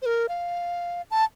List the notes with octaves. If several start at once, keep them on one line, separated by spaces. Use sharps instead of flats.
C5
A#4
F5
A5